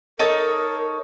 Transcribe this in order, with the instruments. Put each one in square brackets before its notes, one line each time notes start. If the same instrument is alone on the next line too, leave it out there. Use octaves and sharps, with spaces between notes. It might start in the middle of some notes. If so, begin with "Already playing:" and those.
[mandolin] D#4 A4 C#5 [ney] A#4